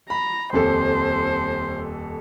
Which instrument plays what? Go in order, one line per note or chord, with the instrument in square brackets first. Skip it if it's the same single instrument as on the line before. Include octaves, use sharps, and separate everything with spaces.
[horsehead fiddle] A#5 [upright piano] B5
[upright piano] D#1 F2 A4 [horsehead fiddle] C5